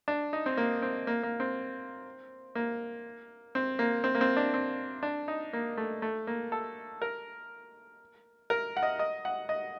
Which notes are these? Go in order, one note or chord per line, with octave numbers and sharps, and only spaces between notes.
D4
D#4
C4
A#3
C4
A#3
A#3
C4
A#3
C4
A#3
C4
A#3
C4
D4
C4
D4
D#4
A#3
A3
A3
A#3
A4
A#4
A#4
F#5
D#5
D#5
F#5
D#5